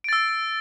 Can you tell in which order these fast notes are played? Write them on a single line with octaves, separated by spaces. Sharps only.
D7 A6 E6